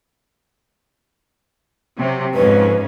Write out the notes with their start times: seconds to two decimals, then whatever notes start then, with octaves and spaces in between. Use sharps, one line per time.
1.97 C3 F#3
2.34 F2 G#2 C#4 B4